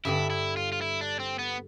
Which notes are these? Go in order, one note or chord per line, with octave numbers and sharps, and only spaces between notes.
G2 D3 G3 E4
E4
F4
F4
E4
D4
C4
B3